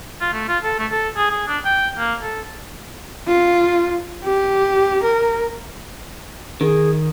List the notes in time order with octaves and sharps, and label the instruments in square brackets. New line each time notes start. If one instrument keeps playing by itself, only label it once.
[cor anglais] F4
A3
F4
A4
A3
A4
G#4
G#4
D4
G5
A#3
A4
[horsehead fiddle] F4
G4
A#4
[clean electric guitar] D#3 [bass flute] G#4